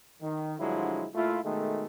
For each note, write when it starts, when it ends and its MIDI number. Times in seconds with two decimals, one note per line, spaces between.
0.21 0.53 51
0.59 1.06 43
0.59 1.06 50
0.59 1.06 53
0.59 1.06 54
0.59 1.06 56
0.59 1.06 64
1.14 1.39 46
1.14 1.39 57
1.14 1.39 64
1.14 1.39 65
1.43 1.86 47
1.43 1.86 51
1.43 1.86 56
1.43 1.86 57